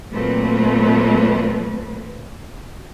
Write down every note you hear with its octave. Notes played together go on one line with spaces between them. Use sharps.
A#2 F#3 A3 A#3 C4 B4